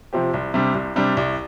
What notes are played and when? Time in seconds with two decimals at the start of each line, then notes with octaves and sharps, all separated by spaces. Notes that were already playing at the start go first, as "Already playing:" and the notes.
0.13 C3 F3 C4 G4
0.34 C2
0.54 C3 G3 D4
0.75 C2
0.96 C3 G3 D4
1.17 C2